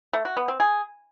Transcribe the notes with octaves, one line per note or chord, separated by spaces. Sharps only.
A3
F#4
B3
C4
G#4